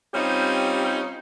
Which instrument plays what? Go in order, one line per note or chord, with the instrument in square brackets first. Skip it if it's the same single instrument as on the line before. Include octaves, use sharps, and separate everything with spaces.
[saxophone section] G3 C4 C#4 D#4 F4 G4